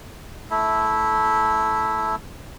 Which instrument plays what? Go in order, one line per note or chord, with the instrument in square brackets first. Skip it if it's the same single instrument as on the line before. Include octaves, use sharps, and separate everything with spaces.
[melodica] A3 E4